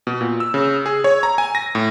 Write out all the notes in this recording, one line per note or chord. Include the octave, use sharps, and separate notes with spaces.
B2
A#2
E6
C#3
G#4
C#5
A#5
G#5
A#6
A2